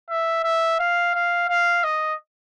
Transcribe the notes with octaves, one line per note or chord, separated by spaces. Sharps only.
E5
E5
F5
F5
F5
D#5